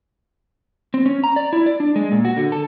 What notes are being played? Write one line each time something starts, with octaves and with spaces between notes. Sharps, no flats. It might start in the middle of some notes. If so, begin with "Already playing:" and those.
C4
C#4
A#5
D5
E4
D5
D4
G#3
A#2
F#4
D3
A4